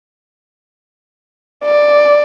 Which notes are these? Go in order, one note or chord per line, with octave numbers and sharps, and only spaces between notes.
D5